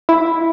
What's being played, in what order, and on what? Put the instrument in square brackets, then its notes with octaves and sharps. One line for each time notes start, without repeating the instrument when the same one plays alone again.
[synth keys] E4